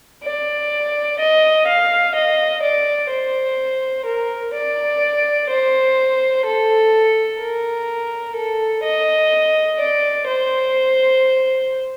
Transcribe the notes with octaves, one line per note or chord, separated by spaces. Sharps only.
D5
D#5
F5
D#5
D5
C5
A#4
D5
C5
A4
A#4
A4
D#5
D5
C5